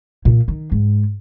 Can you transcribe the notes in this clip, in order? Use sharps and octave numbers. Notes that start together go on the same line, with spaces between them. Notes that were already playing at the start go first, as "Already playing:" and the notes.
A#2
D#3
G#2